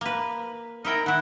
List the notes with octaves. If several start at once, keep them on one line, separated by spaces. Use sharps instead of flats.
A#3 B4
D#4 E4 A#4 G5
D#3 E4 F#5